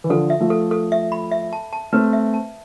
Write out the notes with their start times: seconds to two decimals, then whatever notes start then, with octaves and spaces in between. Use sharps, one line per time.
0.04 E3
0.10 D3 F3 A4
0.30 E5
0.40 F3 A3
0.50 A4
0.71 A4
0.92 E5
1.12 B5
1.32 E5
1.53 A5
1.73 A5
1.93 A3 C4 B4
2.13 E5
2.34 A5